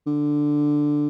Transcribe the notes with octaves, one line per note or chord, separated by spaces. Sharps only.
D3